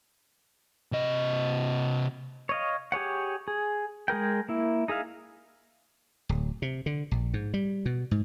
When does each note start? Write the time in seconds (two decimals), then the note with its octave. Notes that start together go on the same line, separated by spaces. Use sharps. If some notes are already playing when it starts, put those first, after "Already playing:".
0.92 C3 D#5
2.49 C#5 D#5 F5
2.92 G4 G#4 C#5 F#5
3.48 G#4
4.08 G#3 G#4 A#4 G5
4.49 A#3 E4
4.88 D#4 G#4 E5 F5
6.29 D1
6.62 C3
6.86 D3
7.11 A#1
7.34 G#2
7.54 G3
7.86 B2
8.11 G#2